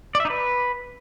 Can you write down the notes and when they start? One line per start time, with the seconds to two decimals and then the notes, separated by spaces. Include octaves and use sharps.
0.15 D5
0.20 E5
0.25 D#4
0.30 B4